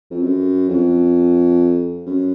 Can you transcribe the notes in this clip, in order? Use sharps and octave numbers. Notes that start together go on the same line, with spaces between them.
F2
F#2
F2
F#2